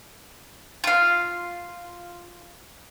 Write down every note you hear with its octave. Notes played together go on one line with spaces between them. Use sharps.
F4 F5